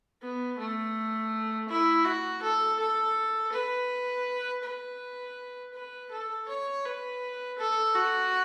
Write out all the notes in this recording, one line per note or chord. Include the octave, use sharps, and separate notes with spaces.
B3
A3
E4
F#4
A4
A4
B4
B4
B4
A4
C#5
B4
A4
F#4